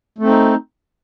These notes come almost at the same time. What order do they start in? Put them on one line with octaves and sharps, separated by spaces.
A3 C4 D#4